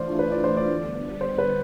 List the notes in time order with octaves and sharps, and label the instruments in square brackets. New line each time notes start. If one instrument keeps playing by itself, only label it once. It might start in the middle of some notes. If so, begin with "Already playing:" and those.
Already playing: [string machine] E3 A3 D4 F4 [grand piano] C5 D5
[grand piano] B4
D5
C5
D5
[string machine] D3 G3 B3
[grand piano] C5
B4